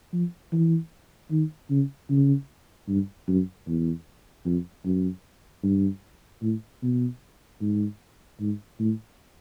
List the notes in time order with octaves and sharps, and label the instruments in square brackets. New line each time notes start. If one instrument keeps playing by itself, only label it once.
[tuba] F3
E3
D#3
C#3
C#3
G2
F#2
E2
F2
F#2
G2
A2
B2
G#2
G#2
A2